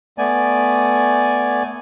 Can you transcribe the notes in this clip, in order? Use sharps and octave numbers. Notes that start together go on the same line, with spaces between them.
A3 B3 D5 G#5